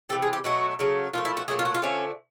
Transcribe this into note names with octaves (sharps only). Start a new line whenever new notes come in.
C3 E3 G3 A4
G#4
G4
B2 F#3 A3 F#4
C#3 F#3 A3
A#2 F3 A3 F4
E4
F#4
A#2 F#3 A3 G#4
F4
F#4
F4
D3 F3 A3 C#4